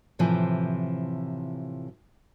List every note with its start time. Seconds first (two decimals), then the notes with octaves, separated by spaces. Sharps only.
0.19 A2 C3 E3 F3